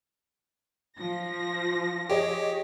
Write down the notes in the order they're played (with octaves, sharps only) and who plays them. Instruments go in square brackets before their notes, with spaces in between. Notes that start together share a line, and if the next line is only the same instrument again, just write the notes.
[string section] F3 A#6
[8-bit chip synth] G4 [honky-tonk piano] G#4 C#5 D#5